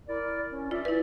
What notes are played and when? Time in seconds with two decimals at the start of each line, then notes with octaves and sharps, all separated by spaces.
0.08 E4 A#4 D5
0.51 C#4
0.71 F4 D5 E5
0.85 E4 B4